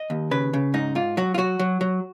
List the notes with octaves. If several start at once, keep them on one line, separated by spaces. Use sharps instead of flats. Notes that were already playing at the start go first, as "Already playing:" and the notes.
Already playing: D#5
D#2
C#3 B4
C#3
G#2 D#4
G#2 F4
F#3 F#4
F4
F#3 F#4
F#3
F#3